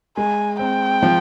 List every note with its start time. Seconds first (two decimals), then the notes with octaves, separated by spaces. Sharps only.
0.17 G#3 G#5
0.59 C4 G5
1.03 F3